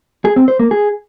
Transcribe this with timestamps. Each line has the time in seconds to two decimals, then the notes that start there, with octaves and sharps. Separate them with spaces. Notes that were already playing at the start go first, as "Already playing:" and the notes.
0.25 G#4
0.36 C4
0.48 C5
0.59 A#3
0.71 G#4